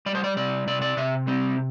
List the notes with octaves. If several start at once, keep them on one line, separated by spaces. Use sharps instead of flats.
G3 D5
C5
D5
C3 D5
C3 D5
D5
C3 E5
G3 C4